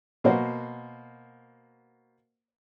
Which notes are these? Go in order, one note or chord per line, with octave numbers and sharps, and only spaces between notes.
B2 A#3 F#4 C5